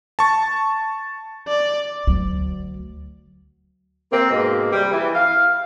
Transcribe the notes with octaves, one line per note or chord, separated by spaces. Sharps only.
A5 C#6 A6
D5
D2 F#3
A#3 C4
G#2 B2 G#3 A#3
C3 G3
E3
F5